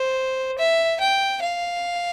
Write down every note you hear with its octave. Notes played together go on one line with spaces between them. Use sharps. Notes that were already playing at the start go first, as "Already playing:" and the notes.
Already playing: C5
E5
G5
F5